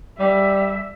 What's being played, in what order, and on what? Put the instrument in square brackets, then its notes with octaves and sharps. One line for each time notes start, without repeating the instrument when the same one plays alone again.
[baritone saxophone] G3 [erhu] E5